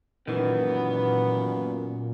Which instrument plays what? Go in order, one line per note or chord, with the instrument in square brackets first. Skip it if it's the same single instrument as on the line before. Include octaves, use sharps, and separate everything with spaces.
[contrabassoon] F#2 [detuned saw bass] A#2 [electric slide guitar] D#3 E3 [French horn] B3